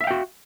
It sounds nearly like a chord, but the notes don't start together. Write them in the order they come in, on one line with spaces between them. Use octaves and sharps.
E5 F5 G5 F#4